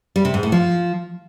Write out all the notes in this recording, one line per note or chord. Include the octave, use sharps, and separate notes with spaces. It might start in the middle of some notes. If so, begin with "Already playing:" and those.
G3
C3
G#2
A2
F3